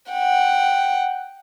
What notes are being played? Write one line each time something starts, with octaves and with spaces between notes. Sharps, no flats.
F#5 G5